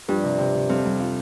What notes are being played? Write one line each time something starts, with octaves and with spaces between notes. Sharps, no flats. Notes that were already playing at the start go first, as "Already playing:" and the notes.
G2 F3
C3
C3
C3
F2 G3
G3
F4